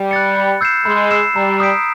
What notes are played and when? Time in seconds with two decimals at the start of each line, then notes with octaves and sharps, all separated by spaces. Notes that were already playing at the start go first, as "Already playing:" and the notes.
Already playing: G3
0.11 F#6 A6 C#7
0.36 B5
0.61 E6 G6 C7 E7
0.85 G#3 B5
1.11 E6 G6 C7 E7
1.36 G3 A#5
1.60 D#6 G6 B6 D7